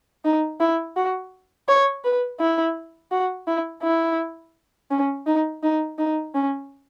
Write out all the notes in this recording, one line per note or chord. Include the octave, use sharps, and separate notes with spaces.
D#4
E4
F#4
C#5
B4
E4
F#4
E4
E4
C#4
D#4
D#4
D#4
C#4